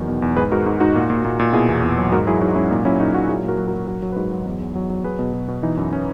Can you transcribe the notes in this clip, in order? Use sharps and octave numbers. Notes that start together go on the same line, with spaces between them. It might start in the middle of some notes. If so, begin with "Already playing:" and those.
Already playing: E2 D#3 F#3
B2
E2
G#2 G#4 B4
G#2 F#4 A#4
G#2
G#2 D#4 F#4
A#2
A#2
A#2
A#2
B2 E4 G#4
E2
E2
F#3
G#2 F#4 A#4
F#3 E4 G#4
F#3 D#4 F#4
G#2 C#4 E4
A#2 D#4
F#3 C#4 E4
A#2 D#4 F#4
A#2 D#4 F#4
F#3 E4 G#4
A#2 F#4 A#4
F#3
F#4 A#4
F#3
F#3 F#4 A#4
F#3
B4
G#2 F#4 A#4
F#3
E2
E2
F#3
F#3
F#3 G#4 B4
B2
B2
B2
E3 D#4
F#2
C#4